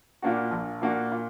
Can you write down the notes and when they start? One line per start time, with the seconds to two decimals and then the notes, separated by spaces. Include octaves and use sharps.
0.22 A#2 A#3 D4 F#4
0.51 A#1
0.82 A#2 A#3 D4 F#4
1.12 A#2